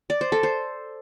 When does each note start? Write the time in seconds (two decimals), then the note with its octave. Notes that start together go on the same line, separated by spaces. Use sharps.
0.10 D5
0.21 C5
0.32 A4
0.43 C5